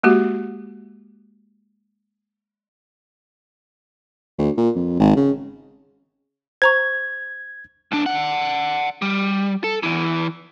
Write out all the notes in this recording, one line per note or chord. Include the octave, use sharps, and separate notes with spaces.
G#3 A#3 F#4 G4
D2
A#2
F2
G#1
C#3
C5 A#5 C#6 G#6
C#2 D4
D5 F#5
G3
A4
E2 E3